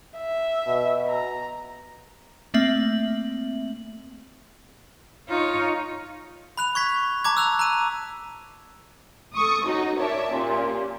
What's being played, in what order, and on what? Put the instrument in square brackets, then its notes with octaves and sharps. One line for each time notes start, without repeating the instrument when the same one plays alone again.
[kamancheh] E5
[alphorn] B2
[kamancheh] A#5
[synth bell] A3 A#3 C4 E5 F#7
[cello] D#4 C#5 [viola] F4
[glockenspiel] B5 F#6 F7
C#6 G#6 B6
A5 A#5 D6 G#6
E6 F#6 F7
A#5 D#7
[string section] A4 C#6 D#6
C#4 D#4 F#4
A#4 C#5 D5 E5 A5
A#2 C#4 G4